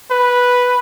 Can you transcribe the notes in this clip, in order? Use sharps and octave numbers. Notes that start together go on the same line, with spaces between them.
B4